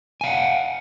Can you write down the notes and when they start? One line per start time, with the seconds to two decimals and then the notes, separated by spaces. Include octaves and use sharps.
0.21 G#5
0.24 F5
0.26 F#5